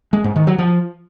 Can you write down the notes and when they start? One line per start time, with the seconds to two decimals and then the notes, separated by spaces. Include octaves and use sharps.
0.13 G#3
0.24 G#2
0.36 D#3
0.47 F#3
0.58 F3